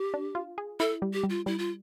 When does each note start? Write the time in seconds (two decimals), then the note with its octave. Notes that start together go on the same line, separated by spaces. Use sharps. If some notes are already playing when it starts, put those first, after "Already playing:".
Already playing: G4
0.14 D4
0.35 F4
0.58 G#4
0.80 E4 A4
1.02 G3
1.13 G4
1.24 G3
1.29 F4
1.46 G3 E4
1.58 F4